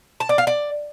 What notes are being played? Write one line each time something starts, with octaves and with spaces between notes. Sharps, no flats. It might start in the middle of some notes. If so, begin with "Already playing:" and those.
A5
D5
F5
D5